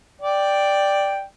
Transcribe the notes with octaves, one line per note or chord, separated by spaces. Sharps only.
D5 G5